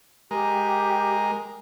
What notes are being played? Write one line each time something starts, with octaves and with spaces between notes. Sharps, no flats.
G#3 G4 A#4